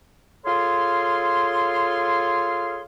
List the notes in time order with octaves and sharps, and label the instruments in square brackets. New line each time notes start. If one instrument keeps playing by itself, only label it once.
[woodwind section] F4 G#4 A4 C#5 F5 C6